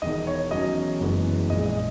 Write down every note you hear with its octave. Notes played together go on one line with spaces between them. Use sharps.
E1 E2 D#3 D#5
C#5
E2 D#3 F#3 C#4 D#5
F#1 F#2 E3 G#3 B3
A#1 A#2 G#3 D#5
D#5